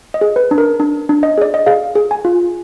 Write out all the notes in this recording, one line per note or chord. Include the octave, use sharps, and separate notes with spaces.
D#5
G#4
B4
D4
A#4
D4
D4
D#5
G#4 D5
D#5
G#4 F5
G#4
G#5
F4